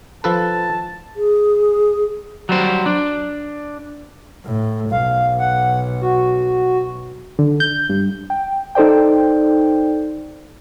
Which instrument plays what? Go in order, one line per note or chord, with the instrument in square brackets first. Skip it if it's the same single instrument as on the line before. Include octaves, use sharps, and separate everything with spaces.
[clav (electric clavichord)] F3 A4 B4 [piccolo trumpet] A5
[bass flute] G#4
[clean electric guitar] F#3 G3 C5
D4
[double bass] A2
[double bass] B1 [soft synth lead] F5
[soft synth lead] F#5
F#4
[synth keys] D3
G6
G2
G5
D#4 A4 C5 D5 G5